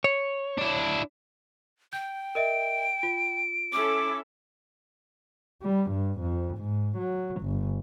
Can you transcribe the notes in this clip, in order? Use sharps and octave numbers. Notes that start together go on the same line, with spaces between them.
C#5
D4 E4
G5 G6
A#4 D#5 E5 D7
F4
C#4 E4 A4 D6
G3
G2
F2
G#2
F#3
G1